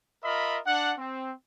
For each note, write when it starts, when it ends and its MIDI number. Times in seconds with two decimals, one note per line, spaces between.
0.24 0.58 65
0.24 0.58 70
0.24 0.58 75
0.24 0.58 76
0.24 0.58 83
0.66 0.92 62
0.66 0.92 78
0.98 1.31 60